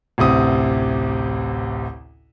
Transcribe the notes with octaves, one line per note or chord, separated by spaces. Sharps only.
A1 D2 C3 D#6